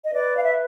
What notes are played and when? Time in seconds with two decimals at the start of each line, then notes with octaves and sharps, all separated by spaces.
0.04 D#5
0.12 B4 D5
0.37 F5
0.44 E5